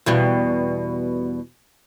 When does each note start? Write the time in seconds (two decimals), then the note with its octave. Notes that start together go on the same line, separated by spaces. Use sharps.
0.06 E2 B2 G3